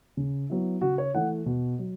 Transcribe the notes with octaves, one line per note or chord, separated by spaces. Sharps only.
C#3
F#3 B3 E4
C#3 F#4
C#5
E3 A3 F#5
B2
F#3